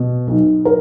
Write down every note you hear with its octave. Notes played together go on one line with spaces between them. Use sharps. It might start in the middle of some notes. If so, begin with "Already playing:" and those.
Already playing: B2
B1
A#4